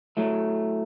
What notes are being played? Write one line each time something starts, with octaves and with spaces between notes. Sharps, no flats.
A2 F#3 A3